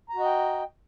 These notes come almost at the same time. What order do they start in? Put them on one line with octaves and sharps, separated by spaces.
A#5 F#4 D#5 G5